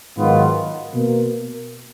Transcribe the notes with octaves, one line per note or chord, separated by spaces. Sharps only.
G#2 D#3 F#3 B3 F4
B2 A#3